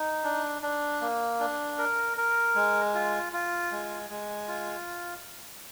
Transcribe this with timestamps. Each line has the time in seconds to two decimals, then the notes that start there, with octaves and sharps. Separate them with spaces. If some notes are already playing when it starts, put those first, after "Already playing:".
Already playing: D#4
0.24 D4
0.62 D4
1.01 A#3
1.40 D4
1.78 A#4
2.17 A#4
2.55 G#3
2.94 F4
3.33 F4
3.71 G#3
4.10 G#3
4.48 F4